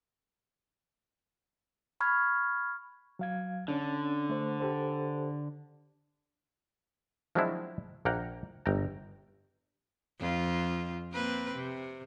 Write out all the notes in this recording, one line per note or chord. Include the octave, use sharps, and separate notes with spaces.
B5 C#6 F6 G#6
F#3 F5 G#6
D3 C#4 D4
A3 C5
G4 A4 C5
F3 F#3 G#3 C4 D4 E4
A#1 A#3 F#5 G5 A#5
G1 G5 A#5
F2 F4
A#3 C4 B4
C3